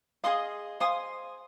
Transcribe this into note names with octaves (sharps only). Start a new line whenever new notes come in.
G#4 D#5 F5 C6 D#6
C5 F5 G#5 D#6